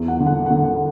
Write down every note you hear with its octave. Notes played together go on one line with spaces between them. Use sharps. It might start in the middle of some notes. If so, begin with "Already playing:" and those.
Already playing: E2
F#5
D3
F#5
F#5
D3
F#5